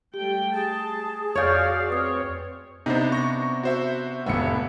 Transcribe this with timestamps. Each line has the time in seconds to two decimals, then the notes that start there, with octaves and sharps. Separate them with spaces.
0.14 G3 A3 G4 G5
0.53 G#4 A5
1.35 F2 F4 F#4 C#5 D5 F5 G6
1.90 C4 B4 C#5 D#6 F6
2.86 C3 B3 D4 D#4 C5
3.12 C#6 A#6
3.63 F#4 C5 E5
4.26 F1 A2 B3 E5 C#7